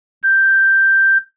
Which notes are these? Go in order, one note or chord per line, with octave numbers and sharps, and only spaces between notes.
G6